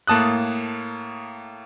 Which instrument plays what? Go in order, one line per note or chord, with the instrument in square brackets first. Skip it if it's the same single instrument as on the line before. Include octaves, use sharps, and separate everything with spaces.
[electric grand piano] A2 A#3 A5 D#6 F#6